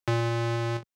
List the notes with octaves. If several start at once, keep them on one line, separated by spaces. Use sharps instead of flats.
A#2